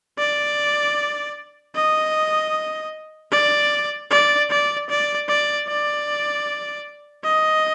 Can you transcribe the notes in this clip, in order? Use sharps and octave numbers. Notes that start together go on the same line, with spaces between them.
D5
D#5
D5
D5
D5
D5
D5
D5
D#5